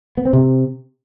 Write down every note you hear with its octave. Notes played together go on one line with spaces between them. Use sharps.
B3
C4
C3